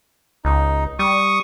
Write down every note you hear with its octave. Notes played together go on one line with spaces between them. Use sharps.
C#2 D#4
G3 C#6 D#6